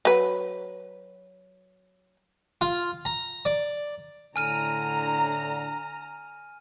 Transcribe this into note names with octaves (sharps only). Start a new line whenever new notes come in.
F#3 B4
F4
A#5
D5
A2 D3 G#5 A#5 F6 D#7